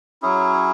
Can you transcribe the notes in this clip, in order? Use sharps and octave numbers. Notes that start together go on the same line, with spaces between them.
F#3 C#4 E4 G#4